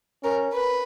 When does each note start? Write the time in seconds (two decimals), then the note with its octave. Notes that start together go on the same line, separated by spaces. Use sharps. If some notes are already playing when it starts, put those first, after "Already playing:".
0.24 C#4 A#4
0.53 B4